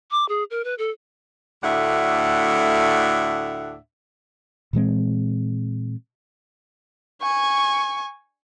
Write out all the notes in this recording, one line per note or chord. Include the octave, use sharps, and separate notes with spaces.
D6
G#4
A#4
B4
A4
D2 A2 D4 E5 F#5
A#2 E3 G#3 C4
G#5 C#6